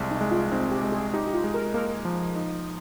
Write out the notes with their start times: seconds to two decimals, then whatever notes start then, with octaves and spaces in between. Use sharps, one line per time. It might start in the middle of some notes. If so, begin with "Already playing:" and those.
Already playing: C2 G#3
0.11 D#4
0.21 G#3
0.31 F4
0.52 C4 D#4
0.72 G4
0.83 G#3
0.92 G#4
1.14 D#4 G4
1.27 G4
1.34 F4
1.44 G#3
1.54 A#4
1.74 A#3 A#4
2.05 F3
2.36 D#4